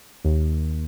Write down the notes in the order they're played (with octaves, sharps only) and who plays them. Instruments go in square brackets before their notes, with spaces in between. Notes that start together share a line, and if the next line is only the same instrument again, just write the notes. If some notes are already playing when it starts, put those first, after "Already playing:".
[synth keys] D#2